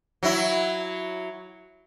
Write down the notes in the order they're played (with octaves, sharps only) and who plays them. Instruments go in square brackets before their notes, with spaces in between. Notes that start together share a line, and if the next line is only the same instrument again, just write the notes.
[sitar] F#3 E4